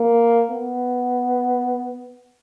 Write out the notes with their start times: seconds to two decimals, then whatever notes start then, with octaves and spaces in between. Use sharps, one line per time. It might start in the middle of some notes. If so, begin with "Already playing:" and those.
Already playing: A#3
0.51 B3